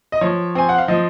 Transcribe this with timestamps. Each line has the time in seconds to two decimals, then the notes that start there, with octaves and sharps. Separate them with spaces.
0.12 D#5
0.21 F3 C#5
0.55 C4 G#5
0.69 F#5
0.78 F5
0.88 F3 D#5